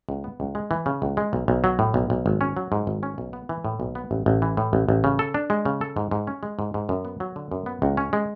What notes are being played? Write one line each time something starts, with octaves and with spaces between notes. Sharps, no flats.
C#2
B3
C#2
G#3
E3
C#3
C#2
G#3
B1
B1
F#3
A2
B1
B1
G#1
C#4
F#3
G#2
G#1
C#4
B1
B3
E3
A2
B1
B3
A1
A1
E3
A2
A1
A1
C#3
A4
D4
G#3
C#3
A4
G#2
G#2
C#4
G#3
G#2
G#2
F#2
B3
F#3
D3
F#2
B3
C#2
C#4
G#3